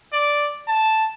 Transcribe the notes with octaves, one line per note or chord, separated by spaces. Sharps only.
D5
A5